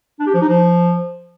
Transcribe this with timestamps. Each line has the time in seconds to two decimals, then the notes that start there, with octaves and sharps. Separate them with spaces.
0.19 D4
0.27 G4
0.34 F3
0.41 D#4
0.49 F3